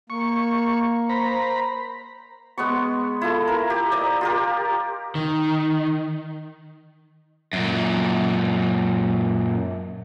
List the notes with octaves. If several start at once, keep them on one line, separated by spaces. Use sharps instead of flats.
A#3 C#6
C5 A#5 B5
G#3 B3 B5 C#6
E4 F4 A4
A#4
G4
D5 D#5 A#5
F4 G4 A#4
D#3
F#2 A#2